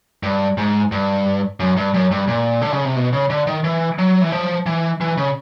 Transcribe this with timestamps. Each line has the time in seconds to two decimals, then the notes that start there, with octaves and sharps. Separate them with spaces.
0.23 G2
0.58 G#2
0.92 G2
1.60 F#2
1.77 G2
1.94 F#2
2.11 G2
2.28 A#2
2.62 D3
2.73 C#3
2.85 C3
2.96 B2
3.13 C#3
3.30 D3
3.47 D#3
3.64 E3
3.99 F#3
4.22 E3
4.32 F3
4.66 E3
5.01 E3
5.17 C#3